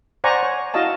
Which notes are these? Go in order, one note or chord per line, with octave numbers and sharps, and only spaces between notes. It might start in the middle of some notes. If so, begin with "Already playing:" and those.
C5 D5 F#5 G#5 A#5 C#6
C#5
E4 F#4 D#5 F5 A5